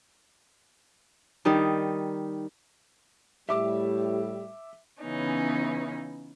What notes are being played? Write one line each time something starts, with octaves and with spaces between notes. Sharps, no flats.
D#3 G3 D#4
A2 G3 G4 E5 D6
C#3 E3 B3 C#4 D#4